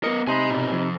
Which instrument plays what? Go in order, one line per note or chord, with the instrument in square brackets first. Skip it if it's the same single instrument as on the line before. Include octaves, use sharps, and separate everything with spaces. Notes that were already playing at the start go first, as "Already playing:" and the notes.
[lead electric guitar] B3 A#4 [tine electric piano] D#5 C#7
[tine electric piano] C3 D#4 B5 [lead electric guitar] G#5 C6
[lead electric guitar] B2 F4
F2